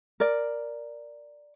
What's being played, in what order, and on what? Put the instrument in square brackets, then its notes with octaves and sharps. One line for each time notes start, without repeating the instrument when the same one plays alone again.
[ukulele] A#4 D5